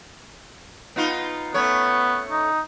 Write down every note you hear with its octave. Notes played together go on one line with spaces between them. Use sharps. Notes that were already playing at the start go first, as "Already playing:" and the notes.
B3 D#4 F4
A3 B3 C#4 C#5
D#4